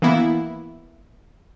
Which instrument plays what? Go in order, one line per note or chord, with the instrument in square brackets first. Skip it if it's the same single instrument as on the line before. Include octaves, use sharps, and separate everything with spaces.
[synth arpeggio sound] E3 A#3 B3 E4